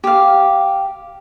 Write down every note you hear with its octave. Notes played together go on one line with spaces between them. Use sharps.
G4 F5